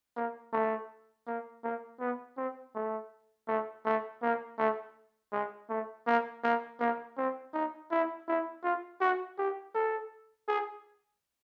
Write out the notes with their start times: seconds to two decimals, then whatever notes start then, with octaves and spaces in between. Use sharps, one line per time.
0.16 A#3
0.53 A3
1.27 A#3
1.64 A#3
2.00 B3
2.37 C4
2.75 A3
3.48 A3
3.85 A3
4.22 A#3
4.58 A3
5.32 G#3
5.69 A3
6.06 A#3
6.44 A#3
6.80 A#3
7.17 C4
7.53 D#4
7.91 E4
8.28 E4
8.64 F4
9.01 F#4
9.38 G4
9.74 A4
10.48 G#4